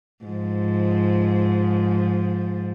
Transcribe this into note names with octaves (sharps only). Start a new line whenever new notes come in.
G#2 F3